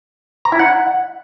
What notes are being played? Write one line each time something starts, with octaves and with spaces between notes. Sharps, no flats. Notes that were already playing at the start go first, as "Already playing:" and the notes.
A#5
E4
F#5